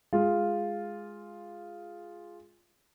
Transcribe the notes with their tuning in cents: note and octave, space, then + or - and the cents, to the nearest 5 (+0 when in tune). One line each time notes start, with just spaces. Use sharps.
G#3 +0 F4 +0